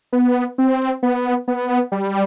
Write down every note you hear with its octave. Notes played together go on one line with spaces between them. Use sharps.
B3
C4
B3
B3
G3